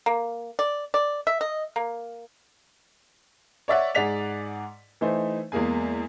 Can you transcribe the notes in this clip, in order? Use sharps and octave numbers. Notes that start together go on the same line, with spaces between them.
A#3
D5
D5
E5
D#5
A#3
C#5 D5 E5 F#5
G#2 G#4 D5 F#5 B6 F7
E3 A3 D#4 C5
E2 G#3 A#3 G#4 G#5